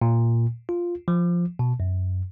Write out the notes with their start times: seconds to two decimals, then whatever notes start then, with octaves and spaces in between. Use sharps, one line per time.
0.02 A#2
0.69 F4
1.08 F3
1.59 B2
1.80 F#2